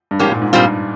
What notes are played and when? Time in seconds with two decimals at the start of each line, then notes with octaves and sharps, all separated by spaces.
0.11 G2
0.19 G#2 F3 A#3 C#4 G4
0.31 A#2
0.42 G#2
0.53 G2 A#2 G3 C4 F4